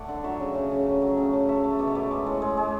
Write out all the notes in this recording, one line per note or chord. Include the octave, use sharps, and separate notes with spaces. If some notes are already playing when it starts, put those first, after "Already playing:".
Already playing: A3 D5 F#5
D3
F#3 C#5 E5
C#3
C#3
C#3
A3
F#3
C#3
A3
A3 C#5 E5
A3
B2 D5
C#5
A3 B4 D5
G#3
A2
G#3
G#3